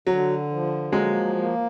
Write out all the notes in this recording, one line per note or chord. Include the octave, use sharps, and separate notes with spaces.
D3 F#3
F3
F#3 G#3 A#3
A#3